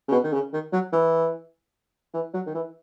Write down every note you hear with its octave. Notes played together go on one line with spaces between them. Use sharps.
C#3
B2
D#3
C#3
D#3
F#3
E3
E3
F#3
D#3
E3